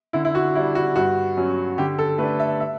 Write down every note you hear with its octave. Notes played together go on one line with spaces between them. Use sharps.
D3 E4
E4
F#4
G3 D4 E4
F#4
G2 F#4
F#3 C#4
D3 G4
A4
A3 D4 B4
E5
E5